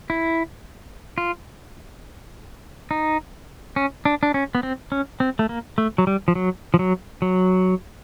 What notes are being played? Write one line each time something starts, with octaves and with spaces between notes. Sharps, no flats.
E4
F4
D#4
C#4
D4
D4
C#4
B3
C4
C#4
C4
A3
A#3
A3
F#3
G3
F3
F#3
F3
F#3
F#3